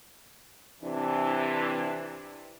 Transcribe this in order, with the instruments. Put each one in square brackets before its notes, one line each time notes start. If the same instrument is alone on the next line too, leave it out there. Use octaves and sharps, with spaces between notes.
[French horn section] C3 E3 D4